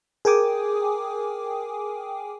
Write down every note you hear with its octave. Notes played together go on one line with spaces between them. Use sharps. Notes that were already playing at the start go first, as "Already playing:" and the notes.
G#4 A#4 G5 G#5 D6 D#6